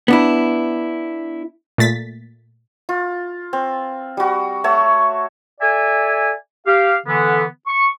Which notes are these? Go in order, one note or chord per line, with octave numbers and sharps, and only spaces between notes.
B3 D4 E4
A#2 A3 A6 B6
F4
C4
G3 F#4
A3 C#5 F#5 E6
A4 D5 E5 G#5
G4 F5
D3 E3 B3
C#6